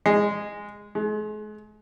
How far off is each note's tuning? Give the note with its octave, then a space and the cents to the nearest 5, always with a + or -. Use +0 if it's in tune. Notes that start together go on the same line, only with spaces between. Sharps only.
G#3 -5
G#3 +40